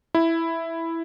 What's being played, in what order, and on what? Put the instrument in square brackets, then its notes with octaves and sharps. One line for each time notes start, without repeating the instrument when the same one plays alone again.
[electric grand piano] E4